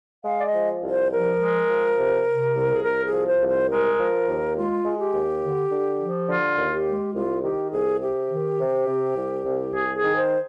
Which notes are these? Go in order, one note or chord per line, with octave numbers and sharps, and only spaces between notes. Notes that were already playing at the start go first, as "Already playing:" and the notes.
G#3 F5
D5
D#5
F3
C2
C5
F3 A#4
G#3
F3
C3
C3
C2
G#4
C2 A#4
G#4
F3
C5
C2
C5
G#3 A#4
F3
D#2
G#3 F4
G#3
G4
D#2
D3
D3
F3
D3 F4
D#2
G4
G#3
C2 F4
D#3 G4
C2 G#4
C3 G4
D#3
C3
C3
C2
C2
C2 G#4
G#4
D#3
C5